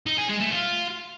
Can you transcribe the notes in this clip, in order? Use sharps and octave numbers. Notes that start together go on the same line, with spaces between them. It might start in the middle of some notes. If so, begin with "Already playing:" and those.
D#4
G#4
G#3
A3
F4